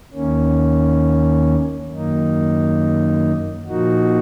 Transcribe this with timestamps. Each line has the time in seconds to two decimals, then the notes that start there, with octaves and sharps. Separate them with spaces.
0.13 D#2 D#3 A#3 C#4
1.90 F#2 D#3 A#3 D#4
3.67 A#2 F3 A#3 D#4 F#4